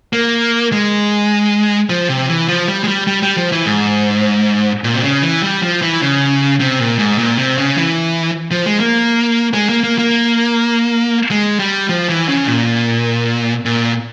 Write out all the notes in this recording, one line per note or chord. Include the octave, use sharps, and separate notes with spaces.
A#3
G#3
F3
C3
E3
F3
G3
G#3
G3
G3
G3
F3
E3
G#2
A#2
C3
C#3
E3
G3
F3
E3
C#3
C3
A#2
G#2
A#2
C3
C#3
E3
F3
G#3
A#3
G#3
A#3
A#3
A#3
G#3
G3
F3
E3
C#3
A#2
A#2